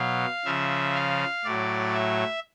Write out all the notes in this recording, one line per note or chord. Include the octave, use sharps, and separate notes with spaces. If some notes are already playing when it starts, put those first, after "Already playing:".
Already playing: B2 F#3 F5
C#3 F3 E5
F5
A2 F#3 D5
E5